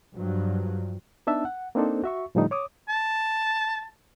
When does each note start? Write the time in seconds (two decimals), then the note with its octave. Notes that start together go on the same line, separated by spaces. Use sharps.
0.15 G2 F3 F#3
1.27 B3 D4 D#4 E5 A5 E6
1.45 F#5
1.75 A#3 C4 D4 D#4 A4 C5
2.04 F#4 E5 C#6
2.35 A2 D3 F3 G3 A3 D#4
2.51 C#5 D6 D#6
2.89 A5